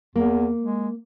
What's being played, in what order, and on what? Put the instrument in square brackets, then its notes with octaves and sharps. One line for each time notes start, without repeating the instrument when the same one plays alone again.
[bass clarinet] E2 [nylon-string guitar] A#3
[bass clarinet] G#3